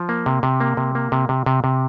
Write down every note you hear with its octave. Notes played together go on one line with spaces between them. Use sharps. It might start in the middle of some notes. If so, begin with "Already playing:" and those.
Already playing: F3
A#3
C3
C3
A#3
C3
A#3
C3
C3
C3
C3